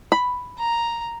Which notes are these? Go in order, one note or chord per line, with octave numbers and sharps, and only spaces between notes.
B5
A#5